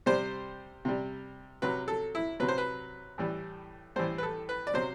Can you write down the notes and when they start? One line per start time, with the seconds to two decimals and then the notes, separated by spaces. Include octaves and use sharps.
0.06 C3 G3 C5
0.85 C3 G3
1.62 C3 F#3 B4
1.88 A4
2.15 E4
2.40 C3 F#3 B4
2.48 C5
2.58 B4
3.18 A2 E3 G3
3.96 A2 E3 G3 C5
4.18 B4
4.23 A4
4.49 B4
4.67 D5
4.74 C3 F#3 C5